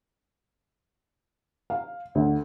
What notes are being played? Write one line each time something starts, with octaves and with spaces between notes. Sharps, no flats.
F5
D2